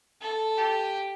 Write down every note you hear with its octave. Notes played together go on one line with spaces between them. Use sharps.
A4
G4